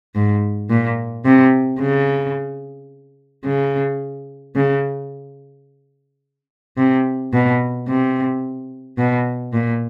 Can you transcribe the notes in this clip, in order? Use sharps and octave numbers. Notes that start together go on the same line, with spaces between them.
G#2
A#2
C3
C#3
C#3
C#3
C3
B2
C3
B2
A#2